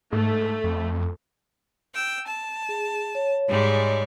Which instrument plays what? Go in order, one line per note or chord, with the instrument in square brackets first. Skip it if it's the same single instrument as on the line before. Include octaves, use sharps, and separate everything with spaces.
[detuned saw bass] G#2 [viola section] A3
[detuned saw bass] F2
[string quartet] G5 E6
A5
[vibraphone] G#4
C#5
[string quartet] G#2 G3 G#3